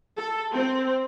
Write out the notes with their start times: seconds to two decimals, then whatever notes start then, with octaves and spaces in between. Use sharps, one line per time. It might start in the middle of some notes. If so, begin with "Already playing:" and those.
0.18 A4
0.54 C4